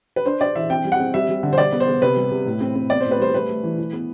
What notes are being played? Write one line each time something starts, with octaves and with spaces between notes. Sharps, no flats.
B4
D4 C5
D4 D5
E3 E5
C4 G5
G3
F#5
C4
G3 E5
G3
D3
C5
G3 D5
B3
C5
B3
C3 B4
G3
C3
A2
C4
C4
B3 D5
A2 C5
B4
G3 C5
A3 B4
A3
E3
E3
B3